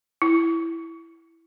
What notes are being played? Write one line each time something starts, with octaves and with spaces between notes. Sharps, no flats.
E4